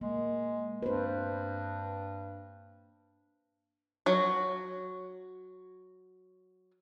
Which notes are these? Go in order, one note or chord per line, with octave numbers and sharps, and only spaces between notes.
G#3 A#3
G2 B4 C5
F#3 F#4